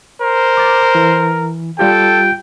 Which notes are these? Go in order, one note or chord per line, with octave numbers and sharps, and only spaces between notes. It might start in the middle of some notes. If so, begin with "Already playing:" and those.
A#4 C5
D6 A6
E3
G3 F4 G4 A4 G5